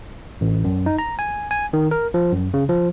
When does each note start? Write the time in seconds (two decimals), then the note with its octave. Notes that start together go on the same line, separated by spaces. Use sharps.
0.41 A1
0.65 F#2
0.86 D#4
0.99 A#5
1.19 G#5
1.51 G#5
1.73 D#3
1.91 A#4
2.14 F3
2.33 F#2
2.54 C#3
2.69 F3